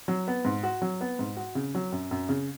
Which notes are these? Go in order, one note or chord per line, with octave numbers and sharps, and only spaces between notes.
F#3
B3
G#2
F#4
F#3
B3
G#2
F#4
C#3
F#3
F#2
F#2
C#3